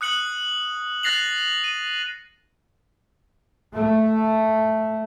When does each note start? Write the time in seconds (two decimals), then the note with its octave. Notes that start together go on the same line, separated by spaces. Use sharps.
0.01 D#6 F#6 C#7 F#7
1.03 F#6 A6 A#6 C7 F7 F#7
1.64 D#7
3.74 A3